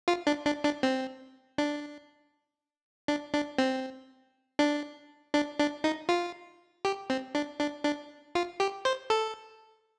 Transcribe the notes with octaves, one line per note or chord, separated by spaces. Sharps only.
F4
D4
D4
D4
C4
D4
D4
D4
C4
D4
D4
D4
D#4
F4
G4
C4
D4
D4
D4
F4
G4
C5
A4